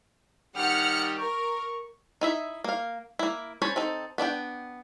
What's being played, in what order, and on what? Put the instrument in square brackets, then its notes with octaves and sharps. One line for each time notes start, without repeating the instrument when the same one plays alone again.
[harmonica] D#3 G3 G4 [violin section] F#5 F6 C#7
[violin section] A#4 [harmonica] C#6
[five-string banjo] D#4 E4 E5
A#3 F5
A#3 E4
C#4 C5 C#5 A5 B5
C4 D#4 A4
B3 D4 F#5 G5